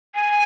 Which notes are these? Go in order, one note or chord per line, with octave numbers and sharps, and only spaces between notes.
G#5